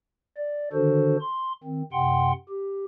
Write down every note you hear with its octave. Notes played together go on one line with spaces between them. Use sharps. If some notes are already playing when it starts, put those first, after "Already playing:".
D5
D3 D#3 D4 F#4 A4 C5
C6
D#3 C4
F#2 C3 F#5 G5 C6
G4